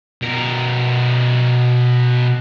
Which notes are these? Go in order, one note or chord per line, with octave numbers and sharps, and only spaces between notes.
B2 A#4